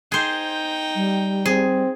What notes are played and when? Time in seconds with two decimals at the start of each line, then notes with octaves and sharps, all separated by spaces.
0.12 D#4 G#4 C5 G5
0.96 G3
1.46 C4 G#4